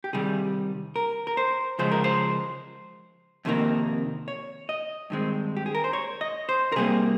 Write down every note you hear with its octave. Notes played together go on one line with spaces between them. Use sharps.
G4
C3 D#3 G3 G#4
A#4
A#4
C5
C#3 F3 G#3 C5
A#4
C5
F2 C3 D#3 A#3
C#5
D#5
G2 D#3 G#3 C4
G4
G#4
A#4
C5
C#5
D#5
C5
A#4
C3 G3 A#3 G#4